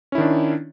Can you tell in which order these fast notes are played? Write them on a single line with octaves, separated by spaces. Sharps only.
C#4 E4 D#3 D4